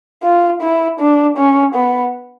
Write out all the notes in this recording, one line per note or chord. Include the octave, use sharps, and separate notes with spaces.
F4
E4
D4
C#4
B3